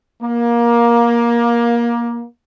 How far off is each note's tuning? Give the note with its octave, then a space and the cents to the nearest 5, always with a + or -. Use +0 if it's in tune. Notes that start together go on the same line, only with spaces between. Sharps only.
A#3 +20